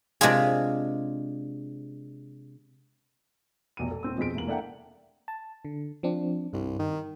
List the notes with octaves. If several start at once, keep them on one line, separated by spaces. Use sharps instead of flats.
C3 G#3 D4 F4 G#4
F1 B1 D#7
A4
D#1 C4 E6
F2 B2 C4 G#4 B6 D7
F1 E2 A#3 F#7
A#3 D4 A4 E5 F#5 G5
A5
D3
F3 C4 D4
C2 G2
D#3